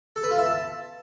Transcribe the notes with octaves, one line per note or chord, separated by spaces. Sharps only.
A4
B4
F4
E5
A5